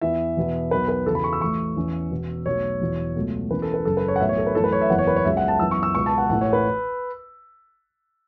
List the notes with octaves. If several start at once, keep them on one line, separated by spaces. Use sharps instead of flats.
E2 E3 B3 E5
E2 B2 B3
B1 B2 B3 B4
B4
E2 C#3 E3 A4
B5
C#6
E6
A1 A2 E3 A3 C#6
E2 E3 C#4
E1 E2 B2 B3
B1 B2 F#3 A3 C#5
E1 E2 E3
C#2 B2 F#3 A3
E1 E2 E3 C#4 B4
A4
B4
F#1 F#2 C#3 A4
B4
C#5
F#5
B1 A2 E3 B3 E5
C#5
A4
B4
F#2 E3 A3 A4
B4
C#5
E5
F#1 E2 E3 B3 F#5
C#5
B4
C#5
C#2 C#3 F#3 B3 E5
F#5
A5
F#2 E3 B3 E6
C#6
E6
C#2 B2 B3 C#6
A5
F#5
A1 A2 E3 A3 F#5
C#5
B4